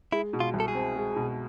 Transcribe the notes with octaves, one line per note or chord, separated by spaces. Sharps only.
G#3 E4
B2
F4
C2
A4
G#4
C4
G#3
B2